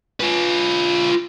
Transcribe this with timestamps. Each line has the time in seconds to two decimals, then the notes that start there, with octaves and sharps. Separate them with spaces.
0.20 F4 B4